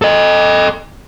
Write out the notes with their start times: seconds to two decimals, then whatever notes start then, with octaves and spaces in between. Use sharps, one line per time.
0.02 A4 D#5